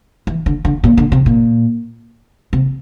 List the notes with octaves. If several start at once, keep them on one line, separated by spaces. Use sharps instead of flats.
E3
D3
D3
A#2
D3
C3
A#2
C3